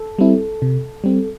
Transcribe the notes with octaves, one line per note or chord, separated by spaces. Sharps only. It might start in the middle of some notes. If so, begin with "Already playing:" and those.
Already playing: A4
G3 C4 E4
C3
G3 C4